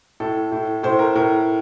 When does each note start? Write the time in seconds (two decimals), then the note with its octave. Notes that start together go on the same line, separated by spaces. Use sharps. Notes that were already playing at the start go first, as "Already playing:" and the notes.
0.20 A2 A4
0.52 A2
0.83 A2 C5
0.99 A#4
1.15 A2 A#4